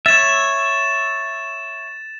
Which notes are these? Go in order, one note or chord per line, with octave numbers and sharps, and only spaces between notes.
C#5 E5 A6 E7